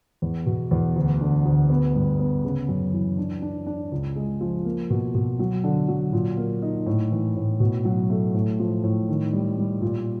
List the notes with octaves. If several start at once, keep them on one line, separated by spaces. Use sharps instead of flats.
E2
B2
E2
D2
D3
D2
B3
G2
B3
C#3
F#2
E3
D4
D4
D4
C#2
G#3
F3
A#3
B2
B2
F#3
D3
F#3
A#2
A#3
D#4
A2
E3
A2
B2
F#3
A3
A2
F3
A2
D#3
G3
G3
A#2